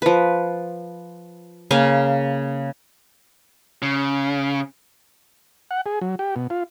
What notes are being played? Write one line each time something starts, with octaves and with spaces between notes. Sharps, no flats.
F3 B4
C#3 A#3 F5 G#5
C#3
F#5
G#4
F#3
G4
B2
F4